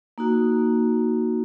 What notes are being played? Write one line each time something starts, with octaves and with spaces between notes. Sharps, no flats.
A#3 D#4 F#4